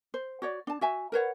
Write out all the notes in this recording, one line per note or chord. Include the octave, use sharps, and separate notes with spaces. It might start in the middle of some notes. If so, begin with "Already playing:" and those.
C5
F#4 C#5 D5
D4 A5
F#4 E5 G#5
A#4 B4 C#5 F#5